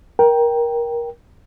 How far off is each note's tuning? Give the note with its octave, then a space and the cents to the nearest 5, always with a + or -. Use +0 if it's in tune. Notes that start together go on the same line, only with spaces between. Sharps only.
A#4 +20 G5 +0